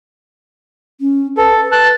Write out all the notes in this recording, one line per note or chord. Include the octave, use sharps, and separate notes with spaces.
C#4
A4 B4
B4 A5 F#6